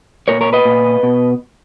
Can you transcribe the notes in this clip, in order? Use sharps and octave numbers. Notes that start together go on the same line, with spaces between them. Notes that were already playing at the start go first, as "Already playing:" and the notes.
A#2 A#4 C#5
A#4 C#5
B4 D#5
A#2
B2